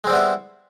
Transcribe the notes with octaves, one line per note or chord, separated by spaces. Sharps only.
G3 G#3 B3 C4 E4